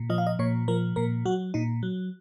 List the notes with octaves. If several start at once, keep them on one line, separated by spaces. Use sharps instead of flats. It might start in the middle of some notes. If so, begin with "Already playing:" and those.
Already playing: A#2
F3 D#5
F5
D#5
A#2 C#5
F3 A#4
A#2 A#4
F#3 F#4
A#2 D#4
F#3